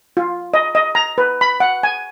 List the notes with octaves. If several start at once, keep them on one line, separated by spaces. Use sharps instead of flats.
F4
D#5
D#5
A#5
B4
B5
F#5
G#5